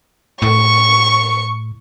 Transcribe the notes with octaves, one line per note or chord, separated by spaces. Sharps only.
A2 C#6